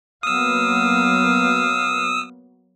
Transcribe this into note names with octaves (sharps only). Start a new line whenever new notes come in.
F#3 A#3 B3 F5 D#6 E6